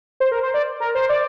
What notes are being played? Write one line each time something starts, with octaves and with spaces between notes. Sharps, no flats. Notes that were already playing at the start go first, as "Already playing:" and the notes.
C5
A#4
C5
D5
A#4
C5
D5